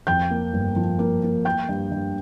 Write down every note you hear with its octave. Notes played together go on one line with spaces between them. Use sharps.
F2 G5 G6
A#3
G1
F3
A#3
A#3
A#3 G5 G6
G2
G2